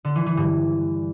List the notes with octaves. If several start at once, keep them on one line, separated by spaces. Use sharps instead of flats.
D3
E3
E3
G2